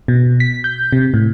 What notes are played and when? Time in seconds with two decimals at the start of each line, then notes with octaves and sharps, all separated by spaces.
0.08 B2
0.40 B6
0.64 G6
0.92 C3
1.14 A2